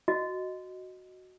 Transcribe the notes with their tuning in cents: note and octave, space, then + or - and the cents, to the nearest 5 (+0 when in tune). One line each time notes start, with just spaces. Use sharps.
F#4 +0 D#5 +0